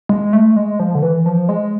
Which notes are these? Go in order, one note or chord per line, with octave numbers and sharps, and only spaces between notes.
G#3
A3
G#3
F3
D3
E3
F3
G#3